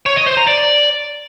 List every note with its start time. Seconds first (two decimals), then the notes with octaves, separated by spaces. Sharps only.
0.06 C#5
0.16 D#5
0.27 C5
0.37 A#5
0.47 D5